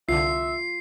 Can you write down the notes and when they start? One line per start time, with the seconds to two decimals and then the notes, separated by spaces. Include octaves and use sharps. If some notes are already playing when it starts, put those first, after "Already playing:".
0.09 C2 D3 F4 E5 C7